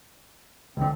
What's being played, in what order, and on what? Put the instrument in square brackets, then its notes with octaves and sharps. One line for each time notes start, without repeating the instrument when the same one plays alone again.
[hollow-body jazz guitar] C#2 D3 [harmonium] C4